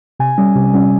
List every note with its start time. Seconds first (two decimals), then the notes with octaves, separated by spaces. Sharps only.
0.19 C3 G#5
0.38 G3 C#4
0.55 C3
0.73 G3 C#4